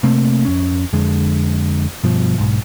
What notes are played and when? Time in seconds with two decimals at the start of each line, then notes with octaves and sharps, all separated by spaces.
0.03 C3 A3 A#3 C4
0.45 F2 C#4
0.93 F2 D3 G#3
2.04 G2 B2 F3
2.38 B1 G#2